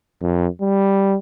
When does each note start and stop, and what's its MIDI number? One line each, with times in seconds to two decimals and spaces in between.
0.22 0.47 41
0.61 1.17 55